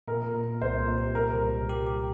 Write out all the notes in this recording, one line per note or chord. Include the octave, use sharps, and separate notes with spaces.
A#2 A#4
A#2
A#3
C2 C5
A#2
G4
G4 A#4
C2
C2
G4
G4